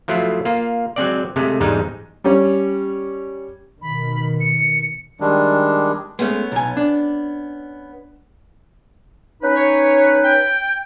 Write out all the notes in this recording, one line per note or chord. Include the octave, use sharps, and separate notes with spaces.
F3 F#3 A3 E4 F4
A#3 F4
F#3 G#3 C4 D5
C3 G#3 A3
E2 G#2 G3 G#3 D#4
G3 C#4
B2 D#3 B5
C#7
D#3 G3 G#3 D4
G#3 A3 B3 C#4
B1 G#5
D4
C#4 D#4 B4
C#5
G5